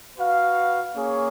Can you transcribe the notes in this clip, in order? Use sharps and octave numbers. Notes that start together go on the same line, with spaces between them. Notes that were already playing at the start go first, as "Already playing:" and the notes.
F#4 B4 F5
A#3 C#4 G#4 C#5